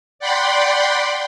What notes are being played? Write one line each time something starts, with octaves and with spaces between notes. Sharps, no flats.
D5 F#5 G5 B5 C6